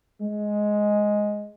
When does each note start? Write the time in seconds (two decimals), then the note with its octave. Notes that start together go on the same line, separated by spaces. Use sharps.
0.22 G#3